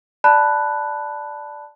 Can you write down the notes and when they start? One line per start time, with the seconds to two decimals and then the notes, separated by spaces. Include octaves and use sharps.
0.24 D5 A5 B5 F#6